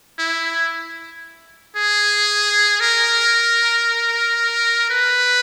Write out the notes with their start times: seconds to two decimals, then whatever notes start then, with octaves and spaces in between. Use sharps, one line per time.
0.19 E4
1.76 G#4
2.80 A#4
4.90 B4